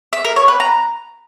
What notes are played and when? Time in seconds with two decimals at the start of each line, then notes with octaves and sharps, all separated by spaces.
0.13 E5
0.25 A#4
0.36 C#5
0.48 B4
0.60 A#5